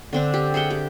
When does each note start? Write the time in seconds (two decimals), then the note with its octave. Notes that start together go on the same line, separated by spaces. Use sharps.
0.13 D3 C4 D4
0.34 G4
0.54 G#4 E5 F#5 G5
0.70 G4